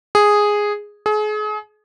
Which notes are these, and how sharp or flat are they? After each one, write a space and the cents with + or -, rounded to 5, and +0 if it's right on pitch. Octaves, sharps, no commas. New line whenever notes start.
G#4 -5
G#4 +35